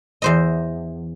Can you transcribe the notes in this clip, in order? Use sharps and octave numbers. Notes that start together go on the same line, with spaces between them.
E2 C5 D#5